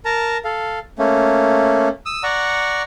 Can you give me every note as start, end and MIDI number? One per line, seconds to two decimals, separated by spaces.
0.05 0.37 70
0.05 0.37 81
0.05 0.37 82
0.45 0.79 69
0.45 0.79 77
0.99 1.89 57
0.99 1.89 58
0.99 1.89 61
2.06 2.23 87
2.06 2.23 88
2.23 2.83 74
2.23 2.83 78
2.23 2.83 82
2.23 2.83 85